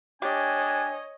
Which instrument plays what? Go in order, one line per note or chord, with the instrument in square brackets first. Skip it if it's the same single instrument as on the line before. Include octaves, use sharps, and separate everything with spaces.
[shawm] D4 [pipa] G4 [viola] C#5 D#5 [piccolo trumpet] G#5